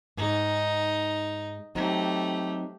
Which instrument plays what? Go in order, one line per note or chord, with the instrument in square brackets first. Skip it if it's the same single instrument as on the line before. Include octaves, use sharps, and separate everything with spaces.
[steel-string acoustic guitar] G#2 G#4 [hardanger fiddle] D#4
[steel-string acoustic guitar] F#3 C4 D#4 [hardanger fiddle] A3 G4